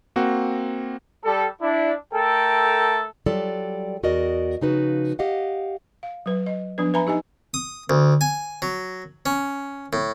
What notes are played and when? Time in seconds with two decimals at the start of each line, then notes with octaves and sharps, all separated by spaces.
0.16 A#3 C4 F#4
1.25 G3 A4
1.62 D4 E4
2.14 A3 A4 A#4 G5
3.26 F#3 G3 F4 A4 D5
4.03 E2 F#4 A#4 D5 D#5
4.61 C#3 F3 D#4 F#4 B4
5.19 G4 D#5 F5 F#5
6.03 F5
6.26 F#3 B4
6.46 D#5
6.78 F3 B3 D4 B4
6.94 B4 E5 G#5 A#5 B5
7.07 D#4 G4 D#5 G#5
7.54 D#6
7.90 D2
8.21 G#5
8.62 F#3
9.26 C#4
9.93 A2